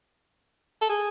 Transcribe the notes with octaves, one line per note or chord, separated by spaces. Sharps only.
A4
G#4